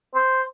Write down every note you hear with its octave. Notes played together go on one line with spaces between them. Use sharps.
C5